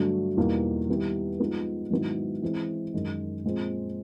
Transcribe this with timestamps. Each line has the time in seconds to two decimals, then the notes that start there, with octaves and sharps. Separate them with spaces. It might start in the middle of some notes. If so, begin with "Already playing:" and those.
Already playing: G2 D3 F#3 A3 D4
0.37 E2 B2 G3 A#3 D#4
0.88 D#3 G3 B3 E4 G4
1.39 F3 G#3 B3 D#4
1.91 G#2 D#3 F#3 B3 E4
2.42 E3 G#3 C4 E4
2.94 F#2 D#3 G#3
3.44 A#2 F3 G#3 C4